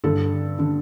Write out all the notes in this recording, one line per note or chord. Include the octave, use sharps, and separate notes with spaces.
G2 D3 A4
D3